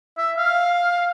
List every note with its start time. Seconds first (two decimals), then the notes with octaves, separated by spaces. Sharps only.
0.18 E5
0.37 F5